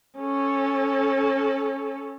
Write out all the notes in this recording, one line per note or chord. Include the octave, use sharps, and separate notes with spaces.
C#4 A4